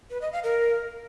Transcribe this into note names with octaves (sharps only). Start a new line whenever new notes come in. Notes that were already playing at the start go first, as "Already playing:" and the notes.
B4
D#5
F5
A#4